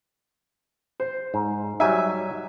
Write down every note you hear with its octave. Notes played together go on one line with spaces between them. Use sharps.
C5
G#2
F#3 G3 D#4 E5 G#5